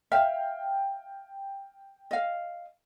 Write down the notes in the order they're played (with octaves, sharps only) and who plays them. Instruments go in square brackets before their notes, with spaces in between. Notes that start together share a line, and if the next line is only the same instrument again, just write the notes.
[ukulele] E5 F5 [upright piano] G5 F6
[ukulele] D#5 F5